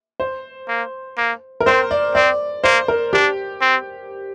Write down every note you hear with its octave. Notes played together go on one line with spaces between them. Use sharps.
C5
A#3
A#3
A#4
C4 C5
D5
C4 D5
A#3 C5
A#4
D4 G4
C4